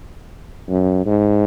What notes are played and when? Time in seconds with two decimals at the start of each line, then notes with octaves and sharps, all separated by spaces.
0.69 F#2
1.06 G#2